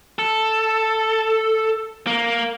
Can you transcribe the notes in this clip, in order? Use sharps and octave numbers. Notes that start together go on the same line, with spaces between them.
A4
A#3